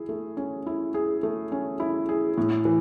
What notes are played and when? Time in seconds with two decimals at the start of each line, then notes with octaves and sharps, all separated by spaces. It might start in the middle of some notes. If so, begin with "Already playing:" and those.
Already playing: E4 G#4
0.09 A3
0.37 C#4
0.66 E4
0.94 G#4
1.23 A3
1.52 C#4
1.80 E4
2.09 G#4
2.38 A2
2.65 E3